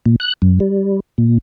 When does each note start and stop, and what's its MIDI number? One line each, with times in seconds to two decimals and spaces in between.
0.06 0.16 46
0.20 0.33 90
0.42 0.59 42
0.60 1.00 55
1.18 1.38 46